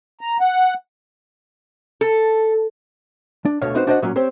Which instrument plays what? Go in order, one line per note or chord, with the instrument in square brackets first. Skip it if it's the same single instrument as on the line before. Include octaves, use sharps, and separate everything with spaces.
[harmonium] A#5
F#5
[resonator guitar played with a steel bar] A4
[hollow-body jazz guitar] D4
D2 B2 D3 C#5 F5
C4 D#4 F#4 B4 C5
D4 F#4 C5 C#5 D#5 F#5
A#2 F#3 C#4
C4 G4 C5 C#5